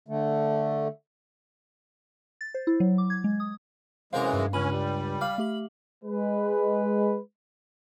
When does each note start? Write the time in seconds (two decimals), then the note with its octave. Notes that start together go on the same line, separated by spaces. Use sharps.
0.08 D3 A3
2.41 A6
2.54 C5
2.67 E4
2.80 F#3
2.98 D6
3.10 G#6
3.24 G#3
3.40 D#6
4.13 F#2 C3 E3 F#3 G#3 A#4 C5 F5
4.33 G2
4.53 C#2 C#4 B5 D#7 F#7
4.71 G3
5.21 F5 B5 D6 F6
5.38 A3 G4 F#7
6.04 G#3 B4